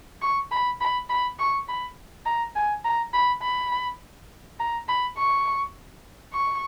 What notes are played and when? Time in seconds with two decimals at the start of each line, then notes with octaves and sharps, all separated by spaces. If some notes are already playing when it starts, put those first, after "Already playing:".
0.22 C#6
0.51 B5
0.81 B5
1.09 B5
1.39 C#6
1.68 B5
2.26 A#5
2.55 G#5
2.84 A#5
3.13 B5
3.42 B5
4.59 A#5
4.89 B5
5.17 C#6
6.33 C#6